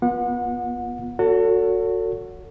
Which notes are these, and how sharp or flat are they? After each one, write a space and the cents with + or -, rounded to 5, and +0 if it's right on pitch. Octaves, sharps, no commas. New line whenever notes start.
B3 -35 F4 +0 F#5 -30
F#4 -15 A4 +30 C#5 +30